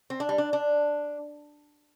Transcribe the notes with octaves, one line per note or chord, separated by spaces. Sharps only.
C4
D4
G3
D4
D4